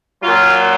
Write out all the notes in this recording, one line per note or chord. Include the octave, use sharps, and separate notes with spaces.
A#2 F#3 F4